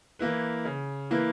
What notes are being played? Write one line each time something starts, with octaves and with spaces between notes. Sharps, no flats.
E3 A#3 E4 B4
C#3
E3 A#3 E4 B4